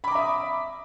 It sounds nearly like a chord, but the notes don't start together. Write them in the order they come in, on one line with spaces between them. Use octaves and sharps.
B5 D6 A#5 E5 D#6